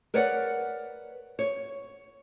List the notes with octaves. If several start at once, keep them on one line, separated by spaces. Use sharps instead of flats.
A#4 B4 C#5 D5 F#5
C#5